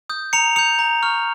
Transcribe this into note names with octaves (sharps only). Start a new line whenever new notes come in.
D#6 G6
A#5 C#7 F7
D#6 G6 C#7 F7
A#5
C#6 F6